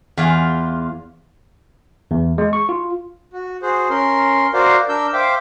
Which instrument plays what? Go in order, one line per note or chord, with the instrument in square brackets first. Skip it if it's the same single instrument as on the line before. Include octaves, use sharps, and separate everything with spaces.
[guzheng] E2 F4
[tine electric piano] E2
G#3
C#6
F4
[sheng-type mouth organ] F#4
F#4 G#4 C5
C#4 A#4 C6
F#4 A#4 C5 D5 F5
D4 A#4 E6 G6
C5 E5 F5 G5 D6